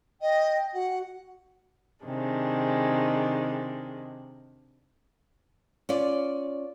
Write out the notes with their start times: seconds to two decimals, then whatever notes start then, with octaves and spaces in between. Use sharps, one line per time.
0.21 D#5 G5
0.74 F#4 F#5
2.05 C3 D#3 G#3 D4
5.89 C#4 F4 D5